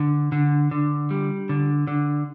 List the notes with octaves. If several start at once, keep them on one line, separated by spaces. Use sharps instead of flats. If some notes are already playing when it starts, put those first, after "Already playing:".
Already playing: D3
D3
D3
G3
D3
D3